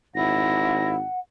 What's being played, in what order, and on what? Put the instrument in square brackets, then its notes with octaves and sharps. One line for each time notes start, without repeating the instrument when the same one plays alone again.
[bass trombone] G#1 [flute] E4 [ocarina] F#5 [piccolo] A#6